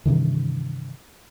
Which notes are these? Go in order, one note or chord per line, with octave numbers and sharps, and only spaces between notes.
G2 C3 D#3 E3